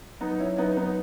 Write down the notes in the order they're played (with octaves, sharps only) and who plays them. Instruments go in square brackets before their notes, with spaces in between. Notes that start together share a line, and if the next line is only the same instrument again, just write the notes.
[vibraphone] F#3 [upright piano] B3 D#4
[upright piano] C#4 E4
[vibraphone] F#3 [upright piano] B3 D#4
[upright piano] B3 D#4